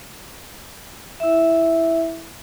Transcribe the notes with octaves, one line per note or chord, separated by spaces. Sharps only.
E4 E5